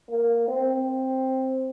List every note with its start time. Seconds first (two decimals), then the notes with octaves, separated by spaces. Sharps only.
0.10 A#3
0.48 C4